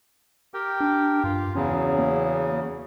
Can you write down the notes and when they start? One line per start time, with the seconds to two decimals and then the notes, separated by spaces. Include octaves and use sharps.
0.54 G4 A#4 G5
0.80 D4
1.24 G2 F4
1.55 E2 C#3 F#3 C#4
1.98 A#3